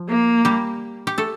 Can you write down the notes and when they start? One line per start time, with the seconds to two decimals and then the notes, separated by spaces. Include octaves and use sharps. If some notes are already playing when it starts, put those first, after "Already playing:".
Already playing: F3
0.09 A#3
0.45 G3 G4
1.07 G4
1.18 A3 A4